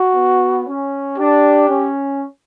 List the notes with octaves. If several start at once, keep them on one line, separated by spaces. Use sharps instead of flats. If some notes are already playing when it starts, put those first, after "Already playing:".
Already playing: F#4
B3
C#4
D4 G4
C#4